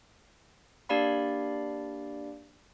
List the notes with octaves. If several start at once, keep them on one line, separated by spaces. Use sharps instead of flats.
A#3 D4 G4 D5 F5 B5